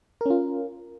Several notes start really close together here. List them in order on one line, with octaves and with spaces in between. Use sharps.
A#4 C#4 F4